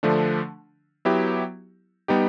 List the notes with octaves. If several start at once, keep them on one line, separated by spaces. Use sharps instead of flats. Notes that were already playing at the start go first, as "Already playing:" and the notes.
D3 F3 A3 D4
F#3 B3 E4 G4
G3 B3 D#4 G4